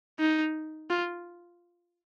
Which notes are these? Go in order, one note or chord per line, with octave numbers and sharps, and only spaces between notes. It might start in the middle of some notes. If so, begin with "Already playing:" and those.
D#4
F4